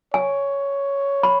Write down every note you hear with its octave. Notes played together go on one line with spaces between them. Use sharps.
C#5 G#5
B5